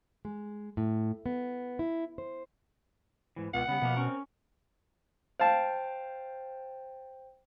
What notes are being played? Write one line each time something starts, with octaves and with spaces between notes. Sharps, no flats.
G#3
A2
B3
E4
C5
G#2 E3
C#2 B2 F#5
C#3 G3 B3
B2 F3 A#3
C4 C#4 A#4
C5 F5 G5 A5